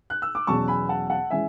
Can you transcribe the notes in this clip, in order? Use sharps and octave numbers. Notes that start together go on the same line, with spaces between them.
F#6
E6
D6
E2 B2 F#3 C#4 A5 C#6
G#5 B5
F#5 A5
F#5 A5
E3 G#3 C#4 E5 G#5